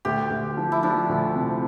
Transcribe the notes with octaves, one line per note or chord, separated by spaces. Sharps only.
D2 G4
D2
F3
E4
F3 D4
D2
C3